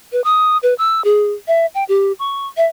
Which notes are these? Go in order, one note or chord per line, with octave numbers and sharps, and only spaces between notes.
B4
D#6
B4
E6
G#4
E5
G5
G4
C#6
E5